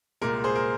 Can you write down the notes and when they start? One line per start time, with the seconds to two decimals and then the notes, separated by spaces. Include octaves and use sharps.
0.21 C2 A#2 G#3 A#4
0.44 G#4 C5
0.55 A#4